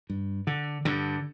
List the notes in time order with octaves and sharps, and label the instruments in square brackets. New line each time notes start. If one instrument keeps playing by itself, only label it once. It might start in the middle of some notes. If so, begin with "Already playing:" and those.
[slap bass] G2
D3
G2 D3